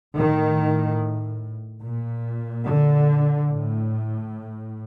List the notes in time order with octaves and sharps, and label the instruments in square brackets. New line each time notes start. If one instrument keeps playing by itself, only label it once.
[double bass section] A2 D#3
A#2
D3
A2